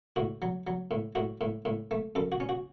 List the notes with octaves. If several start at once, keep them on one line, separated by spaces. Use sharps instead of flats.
A2 F#4
F#3
F#3
A2
A2 F#4
A2
A2
A3
F#2 A4
F#4
C#4
F#4